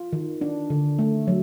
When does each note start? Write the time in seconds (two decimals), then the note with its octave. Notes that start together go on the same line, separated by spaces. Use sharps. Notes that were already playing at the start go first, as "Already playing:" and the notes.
Already playing: F4
0.13 D#3
0.41 D4
0.70 D3
0.99 A3
1.27 F#3